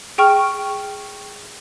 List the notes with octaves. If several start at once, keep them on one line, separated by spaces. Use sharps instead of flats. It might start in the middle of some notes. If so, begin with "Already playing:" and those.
G#4 G5 C#6 F6